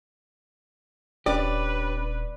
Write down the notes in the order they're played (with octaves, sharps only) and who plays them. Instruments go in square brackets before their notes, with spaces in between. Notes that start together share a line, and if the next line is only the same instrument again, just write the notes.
[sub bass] D#1 [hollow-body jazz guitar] C#4 D4 G4 [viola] B4 [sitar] D5